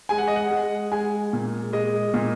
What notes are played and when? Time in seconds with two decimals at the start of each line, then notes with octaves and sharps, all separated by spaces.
0.09 G#3 G#5
0.18 F#5
0.28 D#5
0.36 F#5
0.50 G#3
0.92 G#3 G#5
1.33 A#2
1.73 G#3 D#5
2.14 A#2